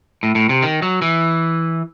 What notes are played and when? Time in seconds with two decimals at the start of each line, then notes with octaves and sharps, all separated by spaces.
0.23 A2
0.35 A2
0.49 C3
0.62 D#3
0.82 F#3
1.02 E3